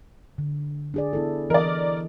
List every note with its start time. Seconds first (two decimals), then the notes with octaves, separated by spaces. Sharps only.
0.38 D3
0.94 D4 G#4 D5
1.13 B3 E4 A4
1.50 E3 A#4 D5 D#5